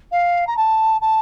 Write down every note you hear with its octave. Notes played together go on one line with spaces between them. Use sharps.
F5
A#5
A5
A5